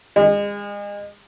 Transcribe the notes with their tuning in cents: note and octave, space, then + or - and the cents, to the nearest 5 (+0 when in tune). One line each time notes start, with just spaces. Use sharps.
G#3 -35